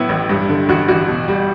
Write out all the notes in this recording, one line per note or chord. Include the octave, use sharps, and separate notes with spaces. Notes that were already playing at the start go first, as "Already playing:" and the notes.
Already playing: A2 F#3 B3 E4
A1
G2
D3
A1 F#4
A1 F#4
B2
G3